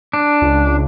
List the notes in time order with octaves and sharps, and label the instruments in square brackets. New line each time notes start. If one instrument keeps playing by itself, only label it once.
[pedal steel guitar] D4
[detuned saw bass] C#2